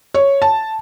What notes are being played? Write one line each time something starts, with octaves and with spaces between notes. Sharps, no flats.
C#5
A5